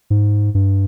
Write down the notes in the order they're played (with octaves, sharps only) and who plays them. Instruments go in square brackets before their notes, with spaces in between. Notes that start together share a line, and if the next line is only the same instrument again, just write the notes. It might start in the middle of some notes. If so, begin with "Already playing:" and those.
[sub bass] G#2
G2